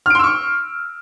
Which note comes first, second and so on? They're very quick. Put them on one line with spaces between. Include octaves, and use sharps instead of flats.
F6 D7 C6 E6 C#6